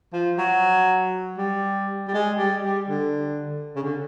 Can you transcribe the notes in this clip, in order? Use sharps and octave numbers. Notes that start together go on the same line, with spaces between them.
F3
F#3
G3
G3
G#3
G3
G3
D3
C#3
D3